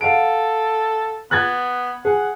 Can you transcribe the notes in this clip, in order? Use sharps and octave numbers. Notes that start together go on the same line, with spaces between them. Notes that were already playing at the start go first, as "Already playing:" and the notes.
A4 F5 F#5 D7
B3 F#6 G#6 A6
G#4 F#5